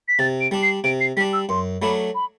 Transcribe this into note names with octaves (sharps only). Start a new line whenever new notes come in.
B6
C3 A6
D7
G3 D4
C7
C3 D7
C7
G3 D4 B6
E6
F#2 C6
F#3 A3 D4 B5
B5